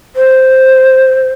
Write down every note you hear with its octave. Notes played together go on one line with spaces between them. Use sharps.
C5